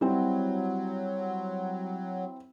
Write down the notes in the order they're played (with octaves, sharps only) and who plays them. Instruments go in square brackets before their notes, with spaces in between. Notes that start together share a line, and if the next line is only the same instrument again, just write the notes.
[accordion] F#3 [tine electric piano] G3 [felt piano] C4 E4